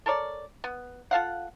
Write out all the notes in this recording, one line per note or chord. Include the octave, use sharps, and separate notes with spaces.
A4 A#4 C#5 D5
B3
F4 A4 F5 F#5